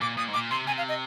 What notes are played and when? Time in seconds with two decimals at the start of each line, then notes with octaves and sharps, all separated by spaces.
0.01 A#2 D6
0.17 A#2 D#6
0.28 G#2
0.34 A#2 D6
0.51 C3 C6
0.67 C3 G#5
0.78 F5
0.89 D#5